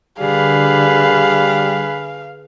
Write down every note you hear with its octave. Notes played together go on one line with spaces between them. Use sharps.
D3 G3 G#4 B4 F5